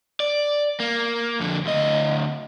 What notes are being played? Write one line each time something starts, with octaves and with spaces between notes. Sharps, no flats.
D5
A#3
F2 D3
D2 D#5